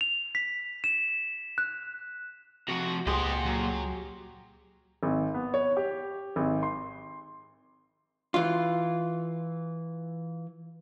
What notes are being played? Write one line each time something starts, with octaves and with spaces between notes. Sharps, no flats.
F7
B6
E7
F#6
C3 F3 F#4
C#2 A#2 G4 G#4 C5 D#5 F#5 C6
F#3
G#1
B3
C#5
G4
G#1
C6
E3 F4